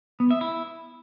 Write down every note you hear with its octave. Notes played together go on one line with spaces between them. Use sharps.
B3
E5
E4